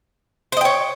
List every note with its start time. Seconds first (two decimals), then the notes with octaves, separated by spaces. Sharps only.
0.52 C5
0.57 D#5
0.61 G5
0.65 C#5